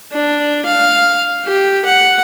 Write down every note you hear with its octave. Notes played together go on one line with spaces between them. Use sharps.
D4
F5
G4
F#5